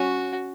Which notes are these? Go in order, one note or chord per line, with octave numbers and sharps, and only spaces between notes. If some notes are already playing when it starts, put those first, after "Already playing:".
Already playing: C#4 F#4